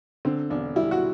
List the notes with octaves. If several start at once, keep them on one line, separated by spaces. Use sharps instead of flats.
D3 C4
E1 D4
G3 E4
F#4